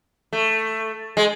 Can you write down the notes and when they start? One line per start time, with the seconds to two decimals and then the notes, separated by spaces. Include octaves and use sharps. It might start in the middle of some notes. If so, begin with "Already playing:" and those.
0.33 A3
1.17 G#3